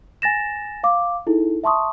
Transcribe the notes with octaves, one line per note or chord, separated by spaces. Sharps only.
G#5 A6 A#6 E7
F5 D6
D#4 E4 G#4 A4
E5 A5 C6 C#6 D#6